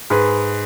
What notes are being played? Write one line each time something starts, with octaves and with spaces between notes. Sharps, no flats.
G#2 G#4 B4